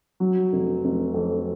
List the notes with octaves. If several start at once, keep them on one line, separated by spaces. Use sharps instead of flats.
F#3
F1
F1
F2